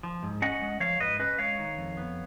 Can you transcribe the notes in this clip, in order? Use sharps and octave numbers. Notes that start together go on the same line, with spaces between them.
F3
G#2
C#4 D#5 F#5
G#3
F3 C#5 F5
G#2 B4 D#5
C#4 B4 D#5
G#3 C#5 F5
D#3
F2
B3